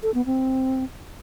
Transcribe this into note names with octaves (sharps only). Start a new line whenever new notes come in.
A4
B3
C4